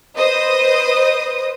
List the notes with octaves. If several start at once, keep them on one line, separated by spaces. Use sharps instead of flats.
B4 C5 D#5 D#6